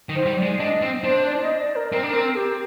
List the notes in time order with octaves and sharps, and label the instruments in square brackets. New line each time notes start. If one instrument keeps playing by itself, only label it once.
[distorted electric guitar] D#3
[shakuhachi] C5
[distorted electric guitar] G3
[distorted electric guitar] G#3 [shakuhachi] D5
[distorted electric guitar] D4 [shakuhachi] D#5
[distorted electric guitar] C4
[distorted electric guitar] D4 [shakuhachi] C5
[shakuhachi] D5
D#5
D5
A#4
[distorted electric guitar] C4 [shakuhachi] A#4
[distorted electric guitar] D4
[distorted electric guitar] C4 [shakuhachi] A#4
[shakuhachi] G4